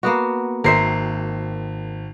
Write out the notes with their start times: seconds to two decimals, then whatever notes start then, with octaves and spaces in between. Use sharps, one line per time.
0.03 A#3 B3 F#4
0.64 G#1 A#4 C5 E5 C7